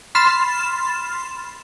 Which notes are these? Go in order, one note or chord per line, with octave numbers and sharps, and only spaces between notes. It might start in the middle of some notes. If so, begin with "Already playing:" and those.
B5 C6 F6 A6 E7